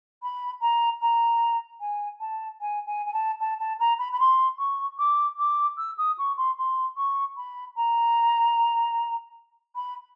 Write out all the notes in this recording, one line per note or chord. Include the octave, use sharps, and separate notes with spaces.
B5
A#5
A#5
G#5
A5
G#5
G#5
G#5
A5
A5
A5
A#5
B5
B5
C6
C#6
D6
D6
E6
D#6
C#6
C6
C6
C#6
B5
A#5
B5